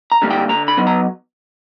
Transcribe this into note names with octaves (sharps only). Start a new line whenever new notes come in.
A#5
D3 G3 A#3
G5
D3 A#5
B5
F#3 B3
A#5